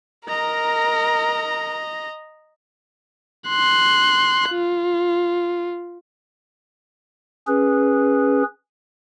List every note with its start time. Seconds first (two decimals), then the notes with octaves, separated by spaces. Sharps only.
0.28 A#4 D#5 A#5
3.49 C6 F#6
4.50 F4
7.47 C#4 G#4 B4